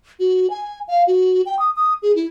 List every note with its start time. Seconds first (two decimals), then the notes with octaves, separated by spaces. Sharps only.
0.20 F#4
0.50 G#5
0.88 F5
1.07 F#4
1.46 G5
1.59 D#6
1.76 D#6
2.02 G#4
2.15 E4